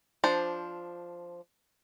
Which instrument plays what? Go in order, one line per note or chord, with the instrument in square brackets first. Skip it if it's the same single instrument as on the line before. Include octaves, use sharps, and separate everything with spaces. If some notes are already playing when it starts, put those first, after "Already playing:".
[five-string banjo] F3 D4 C5